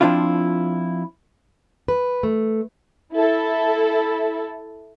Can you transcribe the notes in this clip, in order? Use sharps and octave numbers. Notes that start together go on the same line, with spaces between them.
F3 C4 D4 E4 F4
B4
A3
E4 A4